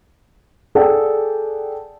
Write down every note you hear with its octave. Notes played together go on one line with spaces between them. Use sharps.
G#4 A4 D5 F#5 G5